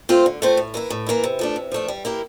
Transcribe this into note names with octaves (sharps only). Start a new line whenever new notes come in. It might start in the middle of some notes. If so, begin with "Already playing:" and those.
A3 C4 F4 C5
D3
A3 C4 F4 C5
A2
E3 A#3 E4
A2
E3 A#3 E4
C3
F3 A3 D4
C3
F3 A3 D4
G3
A#3 E4 G4 A#4